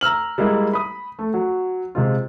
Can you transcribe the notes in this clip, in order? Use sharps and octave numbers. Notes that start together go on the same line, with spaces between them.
A#5 E6 F6 F#7
G3 G#3 A#3 E4
B5 D#6
A3
F#3
C3 G#3 F4